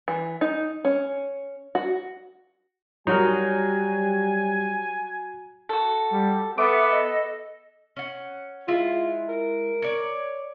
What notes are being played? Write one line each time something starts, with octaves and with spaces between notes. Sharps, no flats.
E3
D#4
C#4
F#4
F#3 G3 D#4 F#4 A#4 G#5
F#4 A4
G3
B3 A4 E5 D6
D#5
C#4 F#5
G#3 E4 F4
A#4
C#5 D5